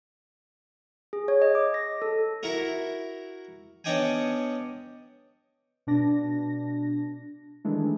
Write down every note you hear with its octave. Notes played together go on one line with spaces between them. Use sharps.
G#4
C#5
D#5
D6
A#6
A4
E4 F#4 A#4
B3 C#4 D4 D#5 G5 G#5
B2 D4 A#6
D#3 E3 G#3 A3 D4